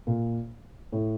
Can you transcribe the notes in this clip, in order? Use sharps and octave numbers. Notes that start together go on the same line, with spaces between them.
A#2
A2